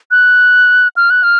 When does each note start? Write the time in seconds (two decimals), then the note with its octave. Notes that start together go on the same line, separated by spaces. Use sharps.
0.11 F#6
0.97 F6
1.10 F#6
1.23 F6